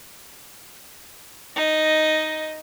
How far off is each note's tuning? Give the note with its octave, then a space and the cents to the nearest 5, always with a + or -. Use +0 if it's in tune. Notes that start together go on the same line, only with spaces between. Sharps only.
D#4 +0 D#5 +0